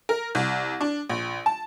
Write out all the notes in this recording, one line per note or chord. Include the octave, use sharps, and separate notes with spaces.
A#4
C2
D4
A#1
A5